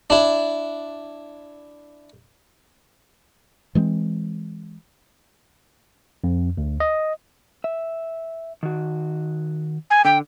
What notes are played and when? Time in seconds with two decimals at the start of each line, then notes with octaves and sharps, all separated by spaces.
0.10 D4 E4
3.75 E3 G#3 A3 C4
6.24 F2
6.57 D2
6.80 D#5
7.64 E5
8.63 D#3 F#4
9.90 G#5
10.05 D3 G5